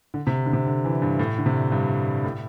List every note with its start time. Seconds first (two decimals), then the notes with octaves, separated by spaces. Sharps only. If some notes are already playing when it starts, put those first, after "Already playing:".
0.14 D3
0.27 C3
0.46 D3
0.53 C3
0.67 D3
0.85 E3
1.02 G2
1.19 A2
1.38 D3
1.46 C3
1.72 G2
2.24 A2